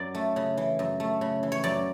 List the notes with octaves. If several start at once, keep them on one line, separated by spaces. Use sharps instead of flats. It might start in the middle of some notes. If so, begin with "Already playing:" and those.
Already playing: F#2 D5
A3
C#3
E3
F#2
A3
C#3
E3
C#5
F#2 D5